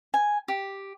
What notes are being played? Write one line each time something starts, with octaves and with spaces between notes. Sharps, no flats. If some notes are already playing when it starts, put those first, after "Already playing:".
G#5
G4